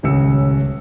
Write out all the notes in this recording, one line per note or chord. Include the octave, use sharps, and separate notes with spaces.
D#1 C#2 C#4 E6 C#7